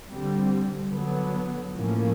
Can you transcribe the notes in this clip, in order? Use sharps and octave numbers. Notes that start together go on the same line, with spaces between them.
D3 G3 C4
D3 F#3 B3
A2 F3 A#3 C#4